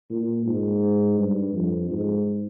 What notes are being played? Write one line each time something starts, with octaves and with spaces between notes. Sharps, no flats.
A#2
G#2
G2
F2
G#2